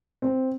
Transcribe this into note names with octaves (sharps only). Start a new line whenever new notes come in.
C4